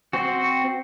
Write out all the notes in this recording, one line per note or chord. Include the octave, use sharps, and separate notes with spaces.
C4 F#4